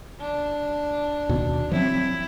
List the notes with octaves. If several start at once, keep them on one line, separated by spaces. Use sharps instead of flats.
D4
D#2 B2
F3 F#3 C4 E4